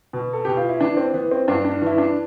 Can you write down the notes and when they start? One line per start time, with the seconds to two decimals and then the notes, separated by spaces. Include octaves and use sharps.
0.13 B2
0.33 A4
0.45 B2 G4
0.57 F4
0.69 E4
0.81 E3 D4
0.97 C4
1.14 E3 B3
1.31 C4
1.48 G2 D4
1.65 D4
1.82 E3 E4
1.98 D4